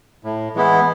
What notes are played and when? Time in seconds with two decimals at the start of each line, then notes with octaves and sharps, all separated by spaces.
0.24 A2
0.55 E3 G#3 B3 E4